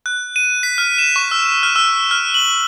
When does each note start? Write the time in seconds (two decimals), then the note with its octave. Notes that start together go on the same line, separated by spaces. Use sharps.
0.06 F#6
0.36 D#7
0.63 B6
0.78 F6
0.98 E7
1.16 C#6
1.31 E6
1.63 F6
1.76 E6
2.11 F6
2.34 F#7